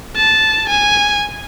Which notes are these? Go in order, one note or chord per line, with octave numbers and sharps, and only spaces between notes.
A5
G#5